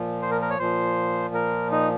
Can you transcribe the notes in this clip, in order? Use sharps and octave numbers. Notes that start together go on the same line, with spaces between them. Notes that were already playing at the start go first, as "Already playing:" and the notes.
Already playing: A#2 F3
C5
A#4
A#4
C#5
A#2 F3 C5
A#4
D#4